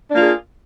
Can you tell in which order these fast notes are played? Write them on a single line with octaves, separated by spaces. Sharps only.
D4 A#3 F4 G#4